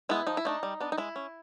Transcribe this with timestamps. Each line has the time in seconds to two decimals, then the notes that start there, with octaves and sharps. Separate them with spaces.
0.09 G#3 B3 E4
0.27 F3 D#4
0.37 E4
0.45 A3 D4 D#4
0.63 G3
0.80 B3 D4
0.92 D#4
0.98 G#3 E4
1.16 C#4